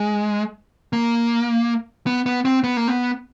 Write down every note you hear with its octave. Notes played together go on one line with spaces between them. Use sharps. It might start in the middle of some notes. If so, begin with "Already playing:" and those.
Already playing: G#3
A#3
B3
B3
C4
B3
A#3
B3